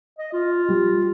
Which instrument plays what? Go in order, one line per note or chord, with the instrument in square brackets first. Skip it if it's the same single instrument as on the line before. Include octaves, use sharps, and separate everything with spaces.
[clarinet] D#5
F4
[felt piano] G3